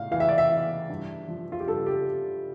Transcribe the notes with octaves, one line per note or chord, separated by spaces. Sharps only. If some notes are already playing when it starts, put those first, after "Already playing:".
Already playing: A2 F5
E3 F5
E5
D5
E5
E3
G2
F3
F4
G4
G2 A4
G4